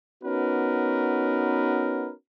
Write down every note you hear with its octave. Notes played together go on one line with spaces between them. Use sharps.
B3 C#4 D#4 F#4 A#4 B4